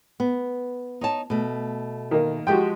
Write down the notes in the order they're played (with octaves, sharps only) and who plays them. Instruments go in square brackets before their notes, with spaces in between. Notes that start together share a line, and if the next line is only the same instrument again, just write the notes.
[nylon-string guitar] B3
D#4 C#5 A5
B2 A3
[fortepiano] D#3 A#3
[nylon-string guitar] F3 G#3 [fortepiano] F#4 G4 G5